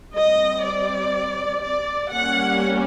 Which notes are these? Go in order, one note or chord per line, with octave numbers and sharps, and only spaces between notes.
G3 C4 D#5
D5
D5
G3 A#3 C#4 F#5